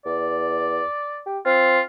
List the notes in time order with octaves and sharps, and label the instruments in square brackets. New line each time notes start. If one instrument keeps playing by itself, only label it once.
[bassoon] E2 [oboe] D5
[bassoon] G4
[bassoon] C4 [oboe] F4